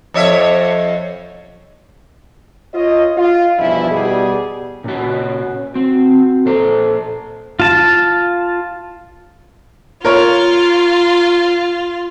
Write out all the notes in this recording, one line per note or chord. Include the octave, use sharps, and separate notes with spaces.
F2 C#5 E5
F4 C#5 D#5
F4
E2 G2 B2 F3 E4
B2 G3 G#4
A#2 C#4 F#4
C4 F#4
A#2 A4 C5
F4 A5
F4 A#4 C#5